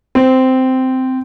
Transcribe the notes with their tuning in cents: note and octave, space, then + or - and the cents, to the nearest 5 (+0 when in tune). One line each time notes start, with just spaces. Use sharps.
C4 -10